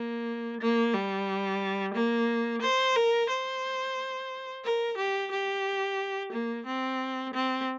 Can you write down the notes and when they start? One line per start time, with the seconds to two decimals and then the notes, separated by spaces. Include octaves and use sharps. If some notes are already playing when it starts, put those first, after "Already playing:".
Already playing: A#3
0.61 A#3
0.94 G3
1.95 A#3
2.62 C5
2.96 A#4
3.30 C5
4.64 A#4
4.97 G4
5.32 G4
6.32 A#3
6.66 C4
7.34 C4